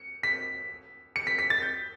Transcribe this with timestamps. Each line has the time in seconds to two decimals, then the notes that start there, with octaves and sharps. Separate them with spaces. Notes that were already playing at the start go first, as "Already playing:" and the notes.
Already playing: C#7
0.23 B6
1.16 C#7
1.27 B6
1.39 B6
1.50 A6
1.62 G6